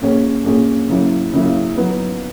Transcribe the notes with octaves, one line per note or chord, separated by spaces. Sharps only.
A#2 A#3 C#4 G#4 C#5
A#2 A#3 C#4 G#4 C#5
C#3 F#3 A#3 C#4 E4
C#3 F#3 A#3 C#4 E4
F#3 B3 D#4